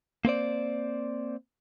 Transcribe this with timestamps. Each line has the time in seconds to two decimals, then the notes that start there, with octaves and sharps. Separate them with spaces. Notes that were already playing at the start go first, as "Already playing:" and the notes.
0.25 A#3 C4 C5 D5